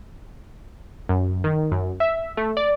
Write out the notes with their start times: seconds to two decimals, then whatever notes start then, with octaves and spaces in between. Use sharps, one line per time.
1.09 F#2
1.44 D#3
1.72 F#2
2.00 E5
2.37 A3
2.57 D5